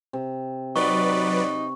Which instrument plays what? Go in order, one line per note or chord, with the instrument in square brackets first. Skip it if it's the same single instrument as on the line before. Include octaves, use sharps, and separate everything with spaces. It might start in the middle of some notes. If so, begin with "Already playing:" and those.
[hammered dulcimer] C3
[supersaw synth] F#3 B4 D5 [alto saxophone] D#4 [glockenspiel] C#6